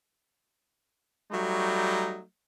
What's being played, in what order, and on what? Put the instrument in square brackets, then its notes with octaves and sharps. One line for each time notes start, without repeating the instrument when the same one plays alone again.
[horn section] F#3 G3 A3 D#4